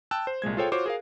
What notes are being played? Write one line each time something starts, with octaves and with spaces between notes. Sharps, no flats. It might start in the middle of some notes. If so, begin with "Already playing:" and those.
G5 A5 E6 F#6
C5
C2 A#2 G#3 G#6
F4 G#4 A4 C5 C#5 G5
F4 F#4 C5 C#5 D6
G#4 A#4 F5